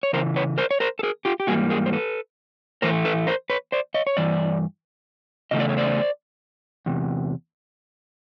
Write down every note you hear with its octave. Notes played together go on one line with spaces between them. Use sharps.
C#5
C#3 E3 A#4 C5
B4 C#5
A#4 C5
C#5
A#4 C5
A4
G#4 A#4
F4 G4
G4
G#2 E3 G3 A#3 F#4 G#4
G#4 A#4
C5
A4 B4
A2 E3 A3 A#4 C5
A4 B4
A#4 C5
B4 C#5
C5 D5
C#5 D#5
C#5
G2 E3 D5
E2 C#3 A3 D#5
D5
C#5
C5 D5
E2 C3